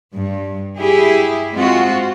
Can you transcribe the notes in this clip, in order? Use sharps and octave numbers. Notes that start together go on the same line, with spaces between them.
G2
E4 G4 G#4
G#3 C4 F4 F#4